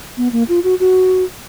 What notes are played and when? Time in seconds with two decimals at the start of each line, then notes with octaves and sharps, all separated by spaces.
0.17 B3
0.33 A#3
0.49 F4
0.64 F#4
0.80 F#4